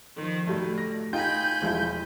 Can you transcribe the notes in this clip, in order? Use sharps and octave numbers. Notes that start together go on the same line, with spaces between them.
D#3 F3
A2 D3 F#3 G3 A3
A#6
D#4 F4 G5 G#5 B5 G6
E1 F3 E4